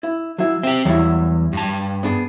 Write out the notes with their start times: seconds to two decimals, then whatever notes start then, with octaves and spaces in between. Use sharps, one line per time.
0.03 E4
0.38 F#3 E4
0.63 C4 G4 E5
0.85 E2 F#3 G3 E4
1.53 G2 A5
2.03 B3 D4 G#4